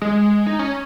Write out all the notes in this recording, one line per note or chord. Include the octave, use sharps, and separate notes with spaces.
G#3
D#4
C#4